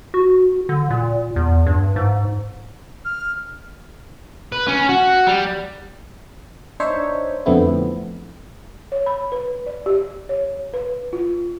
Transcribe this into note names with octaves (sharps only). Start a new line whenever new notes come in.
F#4
D3
A#2
E2
G2
G#2
F6
B4
C#4
F#4
G3
D4 D#4 C5 C#5 E5
F2 D3 A3 B3 C4 E4
C#5
B5
B4
D5
G4
C#5
B4
F4